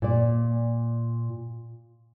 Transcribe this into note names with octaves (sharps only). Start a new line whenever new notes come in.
A#2 D5